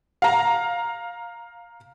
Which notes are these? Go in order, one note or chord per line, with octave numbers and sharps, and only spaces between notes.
F5 A#5